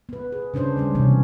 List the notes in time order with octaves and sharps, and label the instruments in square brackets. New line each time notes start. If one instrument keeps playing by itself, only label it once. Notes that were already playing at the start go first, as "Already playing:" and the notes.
[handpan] B3 B4
G#4
C#3 C#4 D4 C5
G3 G#3 C#4
C3 E3 B3 C#4